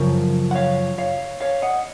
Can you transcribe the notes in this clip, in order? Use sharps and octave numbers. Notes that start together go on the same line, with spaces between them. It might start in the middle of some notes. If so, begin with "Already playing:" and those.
Already playing: F#2 C#3 F3 A#4 C#5
F#5
C#5 F5
C#5 F5
C#5 F5
D#5 F#5